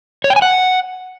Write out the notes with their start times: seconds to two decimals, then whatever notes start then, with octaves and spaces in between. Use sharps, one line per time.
0.24 C#5
0.30 G5
0.36 G#5
0.42 F#5